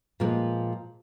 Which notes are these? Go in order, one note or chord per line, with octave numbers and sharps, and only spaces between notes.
A#2 F3 G#3 A#3